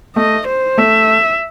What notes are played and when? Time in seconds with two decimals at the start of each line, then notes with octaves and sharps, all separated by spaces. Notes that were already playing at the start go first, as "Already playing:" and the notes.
0.16 A3 D#5
0.48 C5
0.78 A3 E5